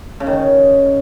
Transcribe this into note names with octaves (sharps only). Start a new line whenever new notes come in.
C#3
D#3
C#3